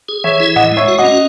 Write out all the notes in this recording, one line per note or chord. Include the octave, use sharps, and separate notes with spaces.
G#4
E3 C#5 E5
E4
A2 D#5 F#5
G#3
C#5 E5
F#4
D#5 F#5
C#4